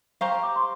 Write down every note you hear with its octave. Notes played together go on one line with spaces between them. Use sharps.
G4 C5 F5 A#5 C#6
D6
C6